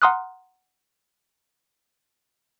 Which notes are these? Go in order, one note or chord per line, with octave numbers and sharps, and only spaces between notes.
F#5 A#5 C6 D#6 F6 F#6